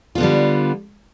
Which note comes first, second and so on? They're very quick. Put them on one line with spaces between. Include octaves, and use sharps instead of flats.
F4 B3 D3 G3